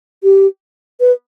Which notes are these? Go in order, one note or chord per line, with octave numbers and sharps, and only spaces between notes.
G4
B4